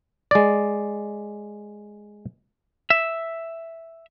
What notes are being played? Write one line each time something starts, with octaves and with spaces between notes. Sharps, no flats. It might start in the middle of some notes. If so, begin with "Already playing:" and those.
G#3 D5
E5